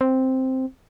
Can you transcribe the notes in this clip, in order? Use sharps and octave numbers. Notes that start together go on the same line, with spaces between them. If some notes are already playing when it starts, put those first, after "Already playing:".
C4